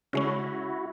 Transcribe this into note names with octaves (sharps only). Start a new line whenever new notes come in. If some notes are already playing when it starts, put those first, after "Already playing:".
C#3 G#3 C#4 E4 F#4